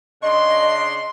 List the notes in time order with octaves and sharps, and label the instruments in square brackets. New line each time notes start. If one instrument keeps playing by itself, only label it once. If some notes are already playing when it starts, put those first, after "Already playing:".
[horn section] C#3 D4 C6 [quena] D#5